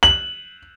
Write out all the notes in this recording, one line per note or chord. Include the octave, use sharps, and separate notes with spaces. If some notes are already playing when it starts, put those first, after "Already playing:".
F#7